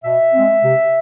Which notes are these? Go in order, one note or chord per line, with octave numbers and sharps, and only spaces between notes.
B2 E5
G#3 C4
C3